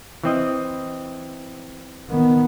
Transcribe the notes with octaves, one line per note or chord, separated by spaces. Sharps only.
E3 C4 D#5
D#3 B3